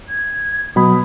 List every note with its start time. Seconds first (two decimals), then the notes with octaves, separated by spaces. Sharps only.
0.09 G#6
0.76 B2 F#3 B5 D#6